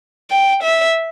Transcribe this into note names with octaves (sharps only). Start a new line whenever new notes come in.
G5
E5